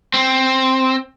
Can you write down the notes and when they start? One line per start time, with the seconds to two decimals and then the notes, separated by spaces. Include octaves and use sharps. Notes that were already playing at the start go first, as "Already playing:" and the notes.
0.14 C4